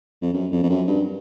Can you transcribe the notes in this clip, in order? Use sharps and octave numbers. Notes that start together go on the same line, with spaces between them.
F2
F#2
F2
F2
F#2
G2